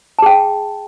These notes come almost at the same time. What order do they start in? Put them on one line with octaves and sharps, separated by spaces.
A5 G#4 G5